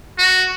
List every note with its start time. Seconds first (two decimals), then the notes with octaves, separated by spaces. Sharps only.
0.18 F#4